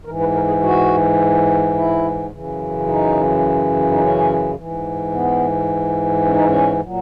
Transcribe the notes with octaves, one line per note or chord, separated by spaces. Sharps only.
G#2 E3 A#4
B4
A#4
G#4
F#4
E4
F#2 C#3 E3
D#4
D#4
C#4
G#2 E3
B3
C#4
D#4
C#4
A#2 F#3